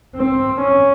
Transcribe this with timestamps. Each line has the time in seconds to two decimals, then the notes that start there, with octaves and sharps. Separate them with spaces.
0.16 C4
0.61 C#4